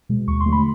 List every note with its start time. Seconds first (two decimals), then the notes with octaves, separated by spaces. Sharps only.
0.09 B2 G#3
0.27 D#2 C#6
0.41 C6
0.46 D3 F#3 A3
0.53 B5